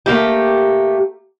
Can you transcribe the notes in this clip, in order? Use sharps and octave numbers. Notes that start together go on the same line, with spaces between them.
A3 A#3 E4 G4